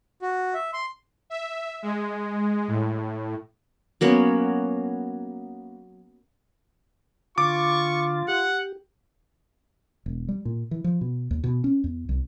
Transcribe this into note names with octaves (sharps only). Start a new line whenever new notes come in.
F#4
E5
C6
E5
G#3
A2
F#3 A#3 B3 C#4
D3 F4 C#6 D6 A6
G4 F#5
E1
G3
A#2
E3
F3
B2
D#2
B2
C#4
E2
C2